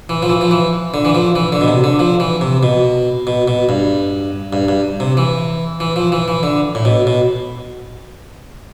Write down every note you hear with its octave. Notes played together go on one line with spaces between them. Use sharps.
E3
F3
E3
F3
E3
D3
E3
F3
E3
D3
B2
C3
D3
F3
E3
C3
B2
B2
B2
G2
G2
G2
C3
E3
E3
F3
E3
E3
D3
A2
B2
B2